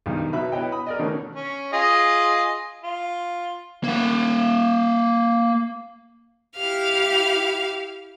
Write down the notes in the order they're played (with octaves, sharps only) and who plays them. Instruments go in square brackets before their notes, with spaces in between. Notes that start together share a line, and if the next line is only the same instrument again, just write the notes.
[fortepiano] B1 G2 D#3 D#4
B2 F#3 B3 E5 B5
B3 E4 C#5 D#5 G5
B5 D#6
A#4 D5 D#5
B2 D#3 A3 B3 C#4
[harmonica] C#4
F4 G#4 D#5
F4
[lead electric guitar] A#3 F#5
[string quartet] E4 G4 F5 F6